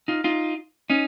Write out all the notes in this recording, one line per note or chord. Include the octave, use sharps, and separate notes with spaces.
D#4 F4
D#4 F4
C#4 D#4